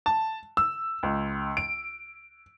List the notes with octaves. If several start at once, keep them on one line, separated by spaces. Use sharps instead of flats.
A5
E6
C#2
D7